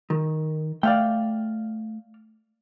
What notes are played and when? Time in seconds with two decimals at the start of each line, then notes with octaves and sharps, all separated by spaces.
0.10 D#3
0.83 A3 D5 F5 G5